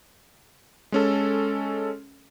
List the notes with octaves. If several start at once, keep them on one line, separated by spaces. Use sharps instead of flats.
G#3 C#4 A4